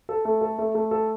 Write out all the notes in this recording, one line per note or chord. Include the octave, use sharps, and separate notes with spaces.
A4
A3
A4
A3
A3
A4